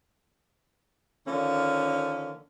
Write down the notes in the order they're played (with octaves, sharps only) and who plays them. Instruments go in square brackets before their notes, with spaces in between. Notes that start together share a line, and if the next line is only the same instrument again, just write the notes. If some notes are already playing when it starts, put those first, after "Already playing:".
[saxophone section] D3 D#3 F3 A#3 C#4